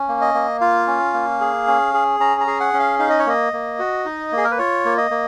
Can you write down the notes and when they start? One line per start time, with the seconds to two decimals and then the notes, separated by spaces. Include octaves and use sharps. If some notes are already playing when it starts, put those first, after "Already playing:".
Already playing: C#4
0.09 A#3
0.21 D#5
0.34 A#3
0.61 F4 F5
0.87 C#4
1.14 A#3
1.41 G#4
1.67 C#4
1.94 G#4
2.20 C#4 A#5
2.41 A#5
2.47 G#4
2.60 F#5
2.74 C#4
2.80 F5
2.99 D#4 F5
3.10 D#5
3.19 C#5
3.27 A#3 D#5
3.53 A#3
3.79 F#4
4.05 D#4
4.32 A#3 G#4
4.44 A#4
4.51 B4
4.58 F4 C#5
4.85 A#3
4.98 D#5
5.11 A#3